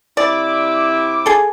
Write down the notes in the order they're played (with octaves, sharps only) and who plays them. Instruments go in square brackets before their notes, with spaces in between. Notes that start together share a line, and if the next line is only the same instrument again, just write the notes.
[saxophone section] C3 C4 E4 [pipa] D5 [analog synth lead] D6
[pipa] G#4 A4